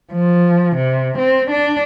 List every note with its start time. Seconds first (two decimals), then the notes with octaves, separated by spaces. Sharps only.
0.13 F3
0.76 C3
1.18 C4
1.50 D4